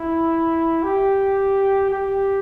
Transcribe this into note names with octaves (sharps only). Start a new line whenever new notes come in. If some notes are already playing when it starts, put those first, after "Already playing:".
Already playing: E4
G4
G4